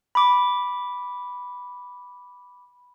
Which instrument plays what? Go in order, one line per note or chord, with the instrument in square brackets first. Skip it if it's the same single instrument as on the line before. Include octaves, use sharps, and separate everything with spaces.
[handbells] B5 D6